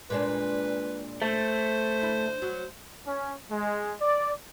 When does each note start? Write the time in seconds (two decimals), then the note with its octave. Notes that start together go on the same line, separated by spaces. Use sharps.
0.10 A#2 G#3 D4 B4
1.22 A3 C5
2.02 D2 E4
2.42 F#3
3.05 C#4
3.49 G#3
4.00 D5